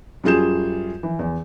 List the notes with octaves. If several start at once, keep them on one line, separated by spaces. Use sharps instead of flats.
F#2 G3 F4 G#4 G6 E7
E3
E2